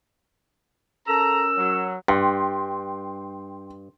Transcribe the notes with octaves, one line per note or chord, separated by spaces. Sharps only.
C#4 A4 A#4 A#5 E6
F#3
G2 G5 C6